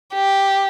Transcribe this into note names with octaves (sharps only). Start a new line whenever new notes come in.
G4